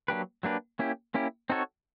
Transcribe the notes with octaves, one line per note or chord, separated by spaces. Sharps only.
F#3 A#3 D4 G4 B4
F#3 A#3 D4 G4 B4
A#3 C#4 E4 G4
A#3 C#4 E4 G4
C4 D#4 F#4 A4 C#5